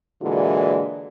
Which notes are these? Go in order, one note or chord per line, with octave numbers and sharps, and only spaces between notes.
A#2 D3 E3 G#3 E4 F#4